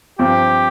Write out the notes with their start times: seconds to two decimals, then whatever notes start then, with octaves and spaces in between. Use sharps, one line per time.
0.19 G2 F3 C4 G4